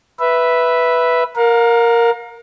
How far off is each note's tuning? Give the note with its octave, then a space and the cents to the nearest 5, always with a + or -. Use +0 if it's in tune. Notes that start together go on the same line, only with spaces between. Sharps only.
B4 +0 E5 +0
A#4 +0 F5 +40